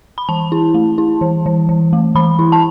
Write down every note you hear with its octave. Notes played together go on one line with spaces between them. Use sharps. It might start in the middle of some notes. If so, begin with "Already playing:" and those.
B5
E3 A5
E4
A3
E4
E3
E3
E3
A3
E3 B5
E4
A5